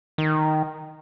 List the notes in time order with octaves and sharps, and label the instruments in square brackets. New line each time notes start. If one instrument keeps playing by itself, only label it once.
[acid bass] D#3